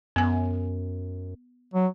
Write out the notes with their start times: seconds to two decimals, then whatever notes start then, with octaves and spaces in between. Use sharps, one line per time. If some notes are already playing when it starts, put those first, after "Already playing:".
0.16 F#2 B3 G#5
1.74 F#3